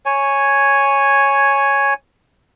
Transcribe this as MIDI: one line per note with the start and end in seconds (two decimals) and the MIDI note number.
0.06 1.94 73
0.06 1.94 80